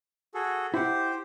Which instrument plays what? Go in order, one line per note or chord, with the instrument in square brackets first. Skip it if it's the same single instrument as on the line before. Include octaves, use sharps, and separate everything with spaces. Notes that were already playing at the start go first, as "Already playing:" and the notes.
[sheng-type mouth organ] F#4 G#4 A4
[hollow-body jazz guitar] E4 F#5 [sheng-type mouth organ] G4 C5